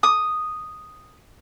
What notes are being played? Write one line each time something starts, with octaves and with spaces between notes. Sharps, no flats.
D#6